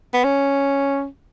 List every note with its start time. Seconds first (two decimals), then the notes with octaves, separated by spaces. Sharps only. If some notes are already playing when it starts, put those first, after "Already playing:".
0.14 B3
0.24 C#4